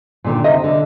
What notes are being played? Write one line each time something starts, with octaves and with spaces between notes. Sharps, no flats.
A#2 D3 D#3
C3 D#5 E5
D3